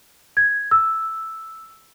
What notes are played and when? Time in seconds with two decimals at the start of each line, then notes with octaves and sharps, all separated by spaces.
0.37 G#6
0.71 E6